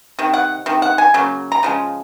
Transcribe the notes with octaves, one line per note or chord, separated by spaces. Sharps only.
C3 D#3
F#5
C3 D#3
F#5
G#5
C#3 F#3 A#3
A#5
C#3 F3 G#3